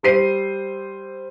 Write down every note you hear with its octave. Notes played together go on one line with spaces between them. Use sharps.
G3 C5 C7 D#7